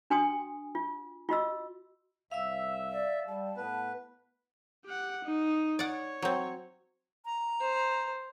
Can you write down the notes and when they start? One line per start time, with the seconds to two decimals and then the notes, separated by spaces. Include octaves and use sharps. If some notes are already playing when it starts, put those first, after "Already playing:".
0.10 D4 F#4 G5 G#5 C6 D#6
0.75 F4
1.29 F4 F#4 D#5 E6
2.31 C2 E5 F5 E6
2.91 D5
3.27 G3 A5
3.57 A2 B3 B4
4.85 G4 F#5
5.24 D#4
5.79 C#5 D5 F#5
6.22 F#3 C4
7.25 A#5
7.60 C5